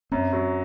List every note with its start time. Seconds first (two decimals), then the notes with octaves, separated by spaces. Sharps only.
0.12 F#2 C4
0.33 F#3